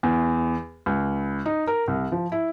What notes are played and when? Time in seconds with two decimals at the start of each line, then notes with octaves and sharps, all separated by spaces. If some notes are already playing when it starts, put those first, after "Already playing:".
0.03 E2
0.86 C#2
1.46 D#4
1.67 A#4
1.88 C2
2.12 F3
2.32 E4